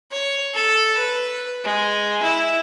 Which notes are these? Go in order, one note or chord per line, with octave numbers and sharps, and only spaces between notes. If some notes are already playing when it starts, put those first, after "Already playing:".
C#5
A4
B4
G#3
E4